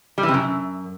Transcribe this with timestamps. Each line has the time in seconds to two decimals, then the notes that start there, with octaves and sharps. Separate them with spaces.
0.18 G3
0.23 E3
0.28 C3
0.34 F#2